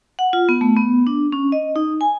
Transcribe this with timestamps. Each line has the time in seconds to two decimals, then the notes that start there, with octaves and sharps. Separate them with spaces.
0.19 F#5
0.33 F4
0.49 B3
0.61 A3
0.76 B3
1.07 D4
1.32 C#4
1.52 D#5
1.76 D#4
2.01 G#5